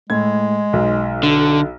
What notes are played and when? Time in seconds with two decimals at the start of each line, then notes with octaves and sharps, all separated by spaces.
0.10 A2 G#3 G#6
0.73 B1 D#4
1.23 D3